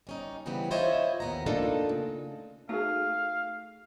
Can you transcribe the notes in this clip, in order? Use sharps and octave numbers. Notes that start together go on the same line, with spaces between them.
G3 C#4 D#4
C#3 E3 G3 B3 C4
E4 F4 C5 C#5 D#5 E5
D#2 B3 A#5
A3 A#3 D4 D#4 F4 A4
C#3
A3 D#4 F#4 G#4 F5